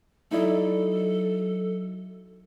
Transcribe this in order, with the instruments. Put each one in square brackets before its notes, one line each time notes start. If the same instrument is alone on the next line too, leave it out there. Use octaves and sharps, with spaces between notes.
[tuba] F#3 [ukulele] D#4 E4 D5 [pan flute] A4